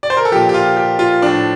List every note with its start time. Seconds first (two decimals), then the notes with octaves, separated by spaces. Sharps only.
0.03 D5
0.10 C5
0.17 A#4
0.25 A4
0.32 A#2 F3 G4
0.49 G4
0.54 F4
0.77 G4
0.99 F4
1.22 A2 F3 D4